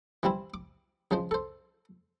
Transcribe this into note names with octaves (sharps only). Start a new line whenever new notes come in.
E3 G3 C4 E4
D6
C#3 F3 G#3 C5
A4 C5